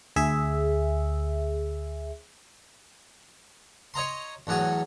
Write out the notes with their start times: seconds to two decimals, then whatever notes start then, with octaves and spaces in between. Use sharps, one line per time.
0.16 D2 G#4 E5
3.94 C#5 D#5 A#5 C6
4.47 E2 A2 F#3 G#4